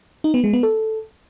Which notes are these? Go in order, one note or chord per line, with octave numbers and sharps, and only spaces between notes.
D#4
B3
G#3
B3
A4